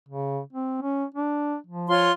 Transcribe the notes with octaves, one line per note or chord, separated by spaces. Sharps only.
C#3
C4
C#4
D4
F3
F4 C#5 C6